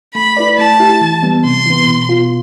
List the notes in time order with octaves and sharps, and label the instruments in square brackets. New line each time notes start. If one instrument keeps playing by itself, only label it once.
[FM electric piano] A3 [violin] B5
[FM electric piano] E4 B4 D5
[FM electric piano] A3 [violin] A5
[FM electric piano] E4 G4
E3
G3 B3
[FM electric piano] C3 [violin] C6
[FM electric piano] E3 B3
B2
B3 F4